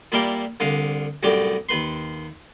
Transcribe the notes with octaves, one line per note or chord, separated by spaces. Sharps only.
A#2 G3 A#3 E4 G4
C2 D3 F5
C2 F#2 A2 G4 D5 D6
D#2 B4 C6